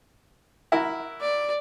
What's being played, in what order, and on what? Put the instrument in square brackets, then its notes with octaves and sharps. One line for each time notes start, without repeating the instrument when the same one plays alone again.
[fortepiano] E4 F#4 A#4
[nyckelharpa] D5